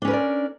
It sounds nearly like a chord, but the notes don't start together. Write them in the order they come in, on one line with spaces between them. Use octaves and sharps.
D4 C#4 B4 A#4 D5